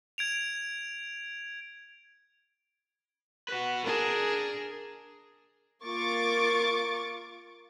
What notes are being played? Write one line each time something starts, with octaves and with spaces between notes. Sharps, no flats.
G#6 D7 F7
F#4 B4
D4 G#4 A#4
A#3 F4 C#6 D6 A6